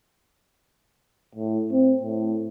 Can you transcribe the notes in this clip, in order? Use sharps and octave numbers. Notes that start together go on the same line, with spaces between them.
A2
C4
A2